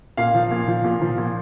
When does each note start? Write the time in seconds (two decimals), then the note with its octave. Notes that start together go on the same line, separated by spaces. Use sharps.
0.17 A#2 F5
0.35 F3
0.51 A#2
0.68 F3
0.84 A#2
1.02 F3
1.18 A#2